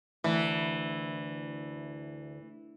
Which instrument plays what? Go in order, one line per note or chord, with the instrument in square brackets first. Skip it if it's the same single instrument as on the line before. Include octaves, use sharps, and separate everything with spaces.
[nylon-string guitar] D2 [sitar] E3